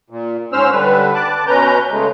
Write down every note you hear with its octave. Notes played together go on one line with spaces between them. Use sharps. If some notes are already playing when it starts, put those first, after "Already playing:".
A#2
G#2 C#4 C5 E6 F6
D3 G3 B4
A5 D6 F#6
B2 C#4 B4 A#5 G6
C#3 G#3 A3